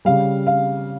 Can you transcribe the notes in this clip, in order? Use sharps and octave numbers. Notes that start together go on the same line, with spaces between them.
C#3 G3 F5
F5